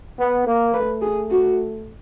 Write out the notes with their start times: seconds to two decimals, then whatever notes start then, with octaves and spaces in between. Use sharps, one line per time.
0.18 B3
0.46 A#3
0.74 A3 B4
1.02 G#4
1.31 F#4